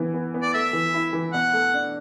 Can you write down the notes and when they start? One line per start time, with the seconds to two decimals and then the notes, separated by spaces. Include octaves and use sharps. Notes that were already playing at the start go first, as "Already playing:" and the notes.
Already playing: E3 B3
0.14 B3
0.34 B3
0.42 D5
0.54 A3 E5
0.73 E3
0.94 E4
1.13 E3
1.33 B2 F#5
1.53 A3
1.74 D4